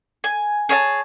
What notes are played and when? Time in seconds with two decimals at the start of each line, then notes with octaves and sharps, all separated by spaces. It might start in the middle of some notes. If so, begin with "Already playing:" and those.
0.24 G#5
0.69 G#4 C#5 E5 A5